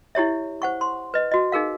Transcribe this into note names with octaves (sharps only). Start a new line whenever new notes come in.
E4 G4 C#5 E5
C5 F#5 C#6
C6
B4 D#5
F#4 D#5
D#4 G#4 A#4 F5